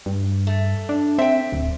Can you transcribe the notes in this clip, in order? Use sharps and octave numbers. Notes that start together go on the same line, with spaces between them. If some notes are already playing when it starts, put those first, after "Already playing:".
G2
A3
D4
C4 E5 G5
D1